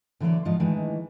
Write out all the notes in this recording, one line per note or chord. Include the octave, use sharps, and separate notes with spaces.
D3 E3 F#3 A#3 C#5 D5
G#2 F3 F4 D#5
D#3 E3 G#3 A3 D4 D#4